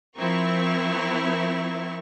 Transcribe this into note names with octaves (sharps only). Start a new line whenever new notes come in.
F3 C4 E4 A#4 C#6